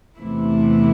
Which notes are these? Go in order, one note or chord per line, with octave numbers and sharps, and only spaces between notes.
E2 C3 E3 A3 E4